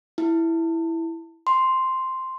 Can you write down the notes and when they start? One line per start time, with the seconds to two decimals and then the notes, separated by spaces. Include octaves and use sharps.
0.18 E4
1.47 C6